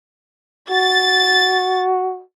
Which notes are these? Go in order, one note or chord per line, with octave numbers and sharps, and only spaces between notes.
F#4 A6